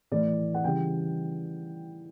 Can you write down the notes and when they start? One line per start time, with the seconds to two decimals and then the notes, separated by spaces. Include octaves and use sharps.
0.11 A2 E3 A3 D5
0.54 F#5
0.64 C#3 E3 G3 G5